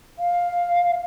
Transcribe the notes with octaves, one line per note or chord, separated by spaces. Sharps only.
F5